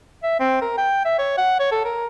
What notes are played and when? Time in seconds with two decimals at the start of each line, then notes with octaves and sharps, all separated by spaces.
0.24 E5
0.40 C4
0.61 A#4
0.78 G5
1.05 E5
1.19 C#5
1.38 F#5
1.60 C#5
1.72 A4
1.85 A#4